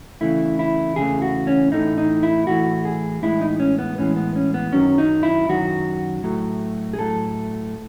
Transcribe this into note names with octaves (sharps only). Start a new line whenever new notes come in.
E2 C#3 E3 A3 E4
E4
E2 C#3 E3 A3 G#4
F#4
C#4
A2 E3 A3 D#4
D#4
E4
A2 E3 A3 F#4
G#4
A2 E3 G#3 E4
D#4
C#4
B3
A2 E3 G#3 C#4
B3
C#4
B3
F#2 D#3 F#3 C#4
D#4
E4
F#2 D#3 F#3 F#4
A2 F#3 A3
G#4
A2 F#3 A3 A4